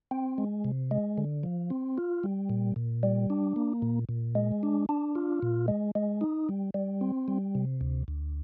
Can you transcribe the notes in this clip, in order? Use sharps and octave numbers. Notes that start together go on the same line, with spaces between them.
C4
G#3
C3
G#3
D3
F3
C4
F4
G3
A#2
A#2
G3
D4
A#3
A#2
A#2
G#3
D4
D4
F4
A#2
G#3
G#3
D#4
G3
G3
C4
G3
C3
D2
D2